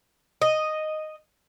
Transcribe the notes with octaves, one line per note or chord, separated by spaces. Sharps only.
D#5